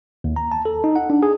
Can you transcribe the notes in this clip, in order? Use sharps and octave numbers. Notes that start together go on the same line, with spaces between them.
D#2
A#5
A5
A4
D#4
F#5
D4
G#4